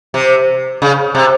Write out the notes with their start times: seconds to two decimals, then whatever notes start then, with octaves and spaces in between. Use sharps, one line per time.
0.14 C3
0.82 C#3
1.15 C3